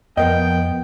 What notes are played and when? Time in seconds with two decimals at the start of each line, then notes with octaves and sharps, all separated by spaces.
0.17 F2 F3 B3 A#4 D#5 G5